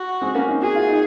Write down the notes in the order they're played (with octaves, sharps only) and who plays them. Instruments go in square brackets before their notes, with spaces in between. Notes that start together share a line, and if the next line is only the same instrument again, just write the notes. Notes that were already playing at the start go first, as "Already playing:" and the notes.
Already playing: [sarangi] F#4
[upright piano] G#3 C4
A#3 C#4
C4 D#4
[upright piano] F#4 [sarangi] G#4
[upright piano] F4
D#4